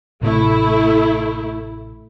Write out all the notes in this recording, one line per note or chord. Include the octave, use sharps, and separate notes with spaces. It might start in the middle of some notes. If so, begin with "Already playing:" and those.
A1 A2 C3 A3 E4